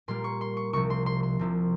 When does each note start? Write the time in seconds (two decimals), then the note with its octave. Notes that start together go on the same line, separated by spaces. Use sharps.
0.08 A#2 G3 A#3 C6
0.24 C#6
0.41 C6
0.57 C#6
0.73 C2 C3 F3 C4 C#6
0.90 C6
1.06 C6
1.23 C6
1.39 C2 C3 F3